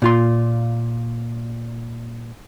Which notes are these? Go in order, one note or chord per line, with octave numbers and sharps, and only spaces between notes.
A#2 F4 C6